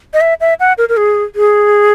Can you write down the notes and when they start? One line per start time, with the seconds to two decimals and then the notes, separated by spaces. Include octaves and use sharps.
0.14 D#5
0.21 E5
0.41 E5
0.60 F#5
0.78 A#4
0.89 A#4
0.97 G#4
1.35 G#4